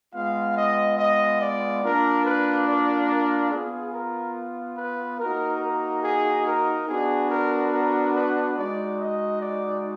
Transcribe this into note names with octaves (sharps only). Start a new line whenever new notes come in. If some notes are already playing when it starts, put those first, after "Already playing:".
G#3 B3 F4 F5
D#5
D#5
D5
A#3 D4 F4 A#4
B4
D5
A#4
B3 F4 G#4
A#4
B4
A#3 D#4 F#4 A#4
A#4
G#4
A#4
B3 D4 F#4 G#4
A#4
A#4
B4
G#3 D#4 F#4 D5
D#5
D5